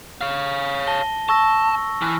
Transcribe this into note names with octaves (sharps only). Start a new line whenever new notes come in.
C#5 F5
A5 A#6 G7
A5 C#6 E6 A#6
E3 F6